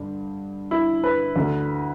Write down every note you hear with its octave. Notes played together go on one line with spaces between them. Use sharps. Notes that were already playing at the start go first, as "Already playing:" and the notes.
Already playing: G2 D3
E4
B4
D2 D3